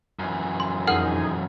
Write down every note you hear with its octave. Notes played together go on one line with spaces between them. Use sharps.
F#2 E3
C6
F2 D#4 G#4 A#4 F#5 F6